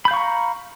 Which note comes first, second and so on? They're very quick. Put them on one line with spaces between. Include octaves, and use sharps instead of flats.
B5 G6 F5 C#6 A#5